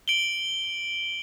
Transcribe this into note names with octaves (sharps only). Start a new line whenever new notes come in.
D7 F#7 G7